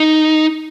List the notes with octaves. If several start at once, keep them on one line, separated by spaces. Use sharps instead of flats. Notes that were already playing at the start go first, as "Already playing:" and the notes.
Already playing: D#4